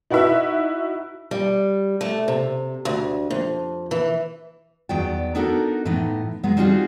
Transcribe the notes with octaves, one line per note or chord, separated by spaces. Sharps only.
D#4 E4 F#4 B4 E5
G3
A3
C3
D2
F2
E3
E2 D#3 F#3 B3 D5 G5
B3 D4 D#4 F#4 A4 A#4
A2 E3 B3 D#4
B2 F#3 G#3 B3
G3 C4 D#4 F4 F#4 G#4